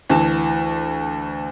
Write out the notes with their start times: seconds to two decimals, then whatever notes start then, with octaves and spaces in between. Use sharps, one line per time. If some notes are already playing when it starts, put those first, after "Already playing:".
0.09 D2 E3 A5